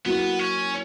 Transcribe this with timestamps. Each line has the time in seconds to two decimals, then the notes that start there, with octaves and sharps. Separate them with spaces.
0.06 F#3 A#3 B3 E4
0.39 C#4